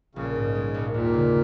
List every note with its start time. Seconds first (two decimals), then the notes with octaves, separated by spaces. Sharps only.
0.15 A#1 C#3
0.35 G#2
0.55 G#3
0.74 A#1
0.94 D#2 A#2
1.14 C#3